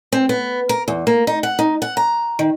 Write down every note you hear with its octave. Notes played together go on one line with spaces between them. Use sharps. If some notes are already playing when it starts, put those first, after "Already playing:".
C4
B3
A#4
E2
A#3
D#4
F#5
D#4
F#5
A#5
D#3